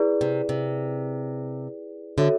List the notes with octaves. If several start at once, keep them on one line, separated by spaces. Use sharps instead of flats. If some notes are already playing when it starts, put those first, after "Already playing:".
Already playing: E4 G#4 B4 D5
C3
C3
D3 F#4 A4 C#5 E5